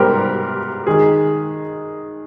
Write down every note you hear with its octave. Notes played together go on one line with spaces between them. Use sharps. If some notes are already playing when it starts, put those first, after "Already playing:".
Already playing: G#2 G3 B3 G4 A#4
D#3 G#3 G#4